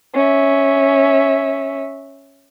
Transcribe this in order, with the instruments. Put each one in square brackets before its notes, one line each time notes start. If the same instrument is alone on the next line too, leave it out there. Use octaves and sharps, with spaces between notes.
[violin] C#4 E5